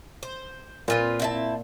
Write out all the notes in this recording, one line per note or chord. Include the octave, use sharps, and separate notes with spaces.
C5
A#2 C4 F4 B4
C4 E4 A5